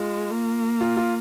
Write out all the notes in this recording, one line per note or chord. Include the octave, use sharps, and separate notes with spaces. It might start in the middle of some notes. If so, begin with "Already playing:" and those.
Already playing: G#3 F4
A#3
F4
F4